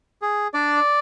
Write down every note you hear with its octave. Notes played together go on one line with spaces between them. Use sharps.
G#4
D4 D5